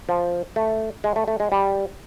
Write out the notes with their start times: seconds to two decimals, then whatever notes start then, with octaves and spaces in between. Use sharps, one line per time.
0.09 F3
0.56 A3
1.04 G#3
1.16 A3
1.28 A3
1.40 G#3
1.52 G3